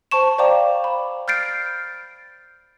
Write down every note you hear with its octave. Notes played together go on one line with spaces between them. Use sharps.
C5 A5 C#6 E7
C5 D5 F5 G5 A#5 D6
B5
F6 G6 A6 C7 D7